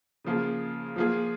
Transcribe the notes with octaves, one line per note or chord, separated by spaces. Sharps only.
C#3 F3 A#3 F4 G#4
F3 A#3 F4 G#4